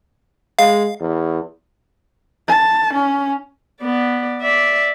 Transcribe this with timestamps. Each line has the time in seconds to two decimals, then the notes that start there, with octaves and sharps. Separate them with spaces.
0.59 G#3 F5
1.00 E2
2.48 A5
2.93 C#4
3.82 B3 D5
4.42 D5 E5